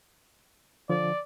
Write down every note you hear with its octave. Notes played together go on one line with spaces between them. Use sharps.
D3 F3 D5